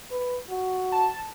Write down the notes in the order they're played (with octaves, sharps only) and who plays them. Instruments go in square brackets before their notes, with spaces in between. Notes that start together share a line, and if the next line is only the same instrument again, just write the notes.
[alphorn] B4
F#4
[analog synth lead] A5